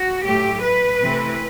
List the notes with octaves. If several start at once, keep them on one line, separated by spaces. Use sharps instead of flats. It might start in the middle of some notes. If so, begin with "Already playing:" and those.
Already playing: F#4
A2 F#3 A3 G4
B4
C3 E3 A3 C4 E4